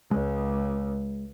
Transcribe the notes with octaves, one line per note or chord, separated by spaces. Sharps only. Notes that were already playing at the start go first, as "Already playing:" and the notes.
C#2 G#3